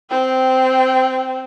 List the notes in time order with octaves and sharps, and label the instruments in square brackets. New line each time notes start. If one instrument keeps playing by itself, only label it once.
[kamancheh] C4 G5